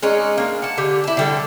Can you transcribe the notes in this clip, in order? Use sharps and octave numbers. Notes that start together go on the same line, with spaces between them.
G#3 C#4 D#4 D5
A#3 D4
F#5 A5
D3 G4
E4 A5
D3 G3 A4